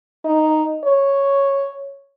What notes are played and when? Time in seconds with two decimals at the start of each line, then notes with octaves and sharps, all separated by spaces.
0.25 D#4
0.85 C#5